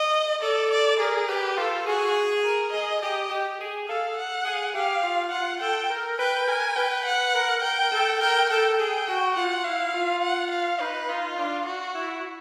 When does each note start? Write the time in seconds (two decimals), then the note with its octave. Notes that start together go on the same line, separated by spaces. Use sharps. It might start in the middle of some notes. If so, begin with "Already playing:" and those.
Already playing: D#5
0.42 A4 D5
0.71 D5
1.00 G#4 A#4
1.29 G4 B4
1.57 F4 A4
1.86 F#4 G#4
2.44 A#4
2.73 G#4 D#5
3.01 G4 D#5
3.30 G4
3.59 G#4
3.88 A4 F5
4.17 F#5
4.45 G#4
4.74 G4 F5
5.03 F4
5.32 F4 F#5
5.61 A4 G5
5.90 A#4
6.18 B4 G5
6.47 A#4 G#5
6.76 B4 G5
7.06 F#5
7.34 A#4
7.63 A#4 G5
7.92 A4
8.21 A#4 G5
8.49 A4 G5
8.78 G#4 G5
9.07 F#4
9.35 F4 F#5
9.64 E4 F5
9.94 F4
10.22 F#5
10.51 F5
10.80 D#4 B4
11.09 D#4 F4
11.37 D4
11.66 F#4
11.95 E4